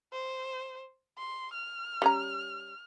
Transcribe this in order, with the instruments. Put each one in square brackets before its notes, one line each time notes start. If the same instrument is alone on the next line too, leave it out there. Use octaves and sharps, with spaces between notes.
[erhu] C5
C6
F6
[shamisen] G3 C#4 A#5